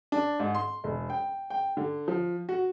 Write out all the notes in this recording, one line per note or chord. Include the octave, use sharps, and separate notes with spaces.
D4
G#2
C6
E1
G5
G5
D3
F3
F#4